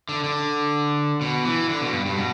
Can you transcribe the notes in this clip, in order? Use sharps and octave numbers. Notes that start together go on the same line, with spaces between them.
D3
D3
B2
E3
D3
B2
G2
G2
B2